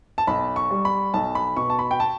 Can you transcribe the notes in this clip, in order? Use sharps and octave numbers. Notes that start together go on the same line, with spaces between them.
A5
B1 B5
C#6
G3
B5
B1 A5
B5
B2 C#6
A5
B5
G5
A5